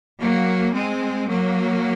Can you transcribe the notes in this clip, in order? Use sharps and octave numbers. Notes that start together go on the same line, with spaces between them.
F#3 A#3
G#3 C4
F#3 A#3